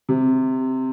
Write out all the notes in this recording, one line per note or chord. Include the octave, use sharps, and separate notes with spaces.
C3